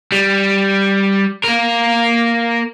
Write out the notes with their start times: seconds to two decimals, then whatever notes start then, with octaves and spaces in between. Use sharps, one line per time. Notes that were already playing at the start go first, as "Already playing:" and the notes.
0.12 G3
1.44 A#3 A#4